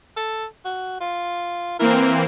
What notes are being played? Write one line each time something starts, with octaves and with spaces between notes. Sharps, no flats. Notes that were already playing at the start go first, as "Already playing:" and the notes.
A4
F#4
F4
E3 A#3 C4 A#4